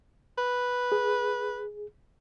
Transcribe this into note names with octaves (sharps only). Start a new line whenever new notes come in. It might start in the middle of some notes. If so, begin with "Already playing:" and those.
B4
G#4